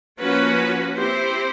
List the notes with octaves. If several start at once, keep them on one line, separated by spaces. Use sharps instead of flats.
F3 A#3 C#4 F#4 B4
C4 E4 G4 C5